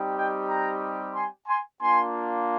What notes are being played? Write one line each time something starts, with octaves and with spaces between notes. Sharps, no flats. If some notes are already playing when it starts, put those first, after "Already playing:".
Already playing: G3 C4 D#4 G4
D#5 G5
G5 A#5
G#5 C6
G#5 C6
A#3 D4 F4 G#5 C6